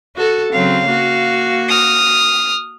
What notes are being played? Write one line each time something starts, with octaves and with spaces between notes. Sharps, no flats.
F#4 A4
C#3 F#3 C4 F5
A#3 F#4
D#6 F6